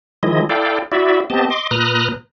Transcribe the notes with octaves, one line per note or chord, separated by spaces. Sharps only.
D#3 F3 G#3 E4 D#5
E4 A4 D5 F5 G5
E4 F#4 D5 E5
B3 C4 G4 D#5 A5
D#5 C6 D6
A#2 B4 A#5 D#6 F6 F#6